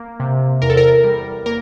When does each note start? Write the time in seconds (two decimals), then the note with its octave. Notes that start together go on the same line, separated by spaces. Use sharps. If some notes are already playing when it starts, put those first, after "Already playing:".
Already playing: A#3
0.20 C3
0.62 E2 A#4
0.70 A4
0.77 A#4
1.04 G3
1.46 A#3 A#4